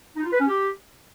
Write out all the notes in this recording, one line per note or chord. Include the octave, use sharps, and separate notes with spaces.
D#4
F4
B4
C#4
G4